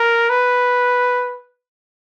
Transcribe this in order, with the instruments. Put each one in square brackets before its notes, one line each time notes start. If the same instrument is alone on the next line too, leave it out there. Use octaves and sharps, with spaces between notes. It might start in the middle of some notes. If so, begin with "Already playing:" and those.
Already playing: [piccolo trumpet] A#4
B4